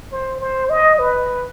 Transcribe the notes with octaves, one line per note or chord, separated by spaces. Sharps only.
C5
C5
D#5
B4